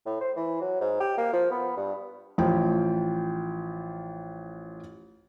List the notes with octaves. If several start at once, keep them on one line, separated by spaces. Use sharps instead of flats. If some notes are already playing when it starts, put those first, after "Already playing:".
A2
C5
E3
F#3
G#2
G4
A#3
F3
B3
G2
A1 F3 G5